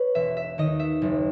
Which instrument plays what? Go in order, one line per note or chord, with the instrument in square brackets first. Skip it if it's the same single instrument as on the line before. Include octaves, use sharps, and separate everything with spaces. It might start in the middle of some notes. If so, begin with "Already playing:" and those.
Already playing: [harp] B4 C#5
E1 E5
E5
D#2 D#3 D#5
E5
F#1